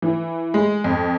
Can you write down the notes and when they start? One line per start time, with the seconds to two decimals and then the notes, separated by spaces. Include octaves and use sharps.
0.02 E3
0.54 G#3
0.84 F2